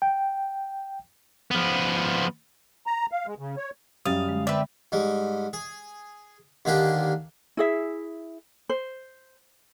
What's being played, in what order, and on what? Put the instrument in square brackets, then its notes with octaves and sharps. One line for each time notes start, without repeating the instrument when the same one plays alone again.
[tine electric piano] G5
[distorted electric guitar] F3 B3
[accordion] A#5
F5
G#3
C#3
C#5
[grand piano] F#2 G3 A6 [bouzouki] F5 [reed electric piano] D#6
[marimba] D3 G#3
[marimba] D3 [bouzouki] C4 B4 [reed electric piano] D5 E5
[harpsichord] G#2 G3
G#4
D#2 D3 A#3 D4 G4
[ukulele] E4 G#4 E5
C5